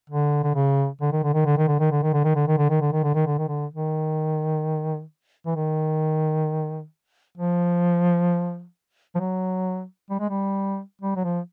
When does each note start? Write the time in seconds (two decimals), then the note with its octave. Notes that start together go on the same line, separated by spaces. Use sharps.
0.10 D3
0.44 D3
0.55 C#3
1.01 D3
1.12 D#3
1.24 D3
1.34 D#3
1.46 D3
1.58 D#3
1.68 D3
1.80 D#3
1.91 D3
2.03 D#3
2.13 D3
2.24 D#3
2.36 D3
2.48 D#3
2.58 D3
2.70 D#3
2.81 D3
2.93 D#3
3.03 D3
3.15 D#3
3.26 D3
3.38 D#3
3.48 D3
3.74 D#3
5.46 E3
5.56 D#3
7.38 F3
9.15 F3
9.20 F#3
10.10 G3
10.20 G#3
10.30 G3
11.02 G3
11.16 F#3
11.24 F3